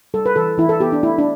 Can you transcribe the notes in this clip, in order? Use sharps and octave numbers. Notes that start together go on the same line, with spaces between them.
G3 A4
B4
E3 A4
E3 E4
A4
B3 G4
D4
A3 E4
D4